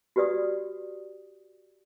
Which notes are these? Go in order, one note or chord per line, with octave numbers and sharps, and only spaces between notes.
F#4 G4 B4 D5 D#6